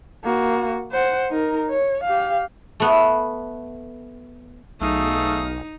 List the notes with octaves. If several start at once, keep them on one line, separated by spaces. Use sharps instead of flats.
A#3 F#4
C5 F#5
D#4 A#4
C#5
G4 F5
A3 B3
B1 A3 D#4 G#4 F5